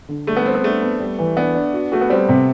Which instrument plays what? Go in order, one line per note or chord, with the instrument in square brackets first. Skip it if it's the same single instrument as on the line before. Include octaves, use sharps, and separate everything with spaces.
[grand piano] D3
[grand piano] G3 [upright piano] A3
[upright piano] B3
[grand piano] G3 [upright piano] C4
[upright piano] B3
[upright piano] A3 [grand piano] D4
[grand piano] B3
G3
E3
[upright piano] B3 [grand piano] D4
[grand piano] D4
F#4
[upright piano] A3 [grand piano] F#4
[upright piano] B3
[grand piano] G3 [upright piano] C4
[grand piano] C3